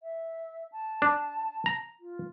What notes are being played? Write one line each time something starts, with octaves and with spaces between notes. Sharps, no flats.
E5
A5
D4
A#5
F4